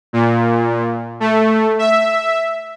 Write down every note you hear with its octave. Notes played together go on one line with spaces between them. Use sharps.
A#2
A3
E5